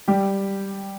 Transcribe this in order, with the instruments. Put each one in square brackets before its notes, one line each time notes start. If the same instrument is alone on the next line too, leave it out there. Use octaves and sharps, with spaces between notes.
[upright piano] G3 G4